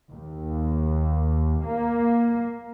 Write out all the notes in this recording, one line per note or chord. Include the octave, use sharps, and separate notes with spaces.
D#2
A#3